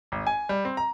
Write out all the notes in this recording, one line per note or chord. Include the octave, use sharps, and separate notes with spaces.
G#1
G#5
G3
C4
A#5